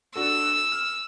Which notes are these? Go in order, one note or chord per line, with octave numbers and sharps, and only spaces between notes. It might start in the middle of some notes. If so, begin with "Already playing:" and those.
D4 F#4 A4 E6
F6